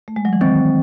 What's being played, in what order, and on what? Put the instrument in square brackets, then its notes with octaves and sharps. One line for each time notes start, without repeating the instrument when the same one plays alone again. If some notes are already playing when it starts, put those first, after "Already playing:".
[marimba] A3
G#3
F#3
E3
[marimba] D#3 [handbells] C4